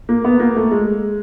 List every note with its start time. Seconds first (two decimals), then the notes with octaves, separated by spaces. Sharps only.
0.09 A#3
0.24 B3
0.40 A#3
0.56 A3
0.71 G#3